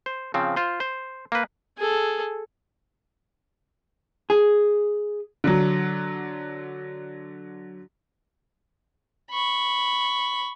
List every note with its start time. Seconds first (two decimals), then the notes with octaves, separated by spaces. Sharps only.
0.06 C5
0.34 C#3 F3 C4
0.56 F4 C5
0.80 C5
1.32 A#3 B4
1.78 G#4 A4
4.30 G#4
5.44 D3 F#3
9.31 B5 C#6